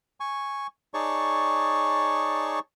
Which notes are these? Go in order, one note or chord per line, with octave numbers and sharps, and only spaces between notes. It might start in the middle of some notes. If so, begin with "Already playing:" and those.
G#5 C#6
D#4 G#4 C#5 D5 A5 C#6